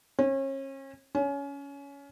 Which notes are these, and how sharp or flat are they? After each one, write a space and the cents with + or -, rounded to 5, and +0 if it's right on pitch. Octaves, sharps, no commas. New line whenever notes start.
C#4 -35
C#4 +20